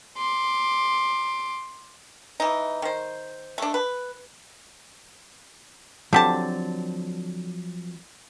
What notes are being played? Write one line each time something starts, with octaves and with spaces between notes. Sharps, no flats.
C6 D6
E3 D#4
D#3 C5
A3 D4
B4
D3 F3 F#3 C4 G4 A5